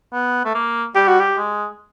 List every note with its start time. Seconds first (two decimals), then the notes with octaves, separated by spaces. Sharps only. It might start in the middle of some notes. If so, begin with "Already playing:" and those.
0.13 B3
0.45 A3
0.55 A#3
0.95 G3 G4
1.07 F#4
1.20 G4
1.37 G#3